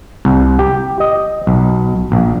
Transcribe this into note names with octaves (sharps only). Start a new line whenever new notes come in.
C2
G4
D#5
B1
A#1